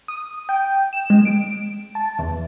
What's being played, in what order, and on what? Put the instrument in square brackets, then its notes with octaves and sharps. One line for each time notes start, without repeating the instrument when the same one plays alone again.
[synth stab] D#6
G5
E7
G#3
D7
A5
E2